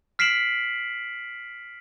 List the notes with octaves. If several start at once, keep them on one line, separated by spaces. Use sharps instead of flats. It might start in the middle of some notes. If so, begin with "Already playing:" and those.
F6 B6 C7 D7 E7 F#7